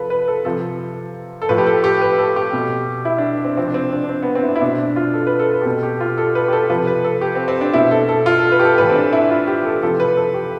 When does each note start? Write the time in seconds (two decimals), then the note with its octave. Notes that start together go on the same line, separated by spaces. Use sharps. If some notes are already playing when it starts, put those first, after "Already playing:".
Already playing: C3 F3 A4 B4
0.10 B4
0.28 A4
0.45 C3 F3 A4
1.42 A4
1.49 A2 F3 B4
1.58 G4
1.66 A4
1.84 G4
2.01 B4
2.19 A4
2.36 G4
2.53 B2
3.05 E4
3.18 D4
3.44 C4
3.57 C3 F3 C4
3.68 D4
3.74 C4
3.93 D4
4.04 D4
4.09 C4
4.23 B3
4.35 C4
4.43 E4
4.48 D4
4.56 E4
4.61 B2 D4
4.79 D4
4.96 F4
5.14 A4
5.27 B4
5.39 A4
5.53 B4
5.61 G4
5.66 B2 A4
5.83 G4
6.01 F4
6.18 A4
6.35 B4
6.48 G4
6.52 A4
6.70 C3 F3 B4
6.87 B4
7.04 A4
7.21 G4
7.35 C4
7.48 C4
7.61 D4
7.74 B2 E4
7.91 A4
8.09 A4
8.26 F4
8.39 A4
8.52 B4
8.59 G4
8.65 A4
8.78 A2 E3 B4
8.89 C4
8.96 D4
9.13 E4
9.30 F4
9.47 G4
9.65 A4
9.82 C3 F3 A4
10.00 B4
10.17 A4
10.34 G4